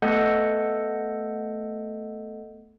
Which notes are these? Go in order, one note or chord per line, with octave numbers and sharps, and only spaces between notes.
A3 B3 A4 D#5 F#5 G6